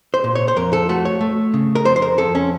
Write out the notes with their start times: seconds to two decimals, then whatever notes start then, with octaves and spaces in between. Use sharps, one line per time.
0.14 C5
0.24 A#2
0.35 C#5
0.48 C5
0.56 F2 A#4
0.73 A4
0.89 A3 F#4
1.05 C#5
1.21 A3
1.54 C#3
1.75 A#4
1.85 F2 C5
1.96 C5
2.02 A#4
2.18 F2 A4
2.35 C#4